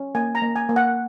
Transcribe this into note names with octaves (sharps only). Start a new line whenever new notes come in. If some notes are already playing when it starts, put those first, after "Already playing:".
Already playing: C#4
A#3 G#5
A#5
A#3
G#5
A#3
F#5